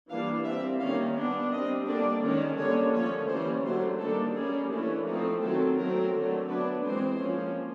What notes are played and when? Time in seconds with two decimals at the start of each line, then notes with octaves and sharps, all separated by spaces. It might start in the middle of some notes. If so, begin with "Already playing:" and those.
0.09 E3 G3 A#3 D4 F5
0.44 G3 C4 E5
0.80 D#3 G3 A#3 C#4 F5
1.15 G3 B3 D4
1.51 G3 C4 D#5
1.86 D3 G3 A#3 D4 D5
2.22 D#3 G#3 C#4
2.58 D3 G3 A#3 C#4 C#5
2.93 F3 A3 C#4 C#5
3.29 E3 G3 A#3 C#4 C5
3.65 D3 F#3 A3 C5
4.00 D#3 G3 A#3 D4 A4
4.36 G3 A#3 C#4 G#4
4.72 E3 A3 C#4 D4
5.07 F3 A3 C4 D#4
5.43 D#3 F#3 A3 C4 A4
5.78 F#3 A3 C4 A#4
6.13 D3 F#3 A3
6.49 F#3 B3 D4 B4
6.84 E3 G#3 C4 C5
7.20 F3 A#3 C#4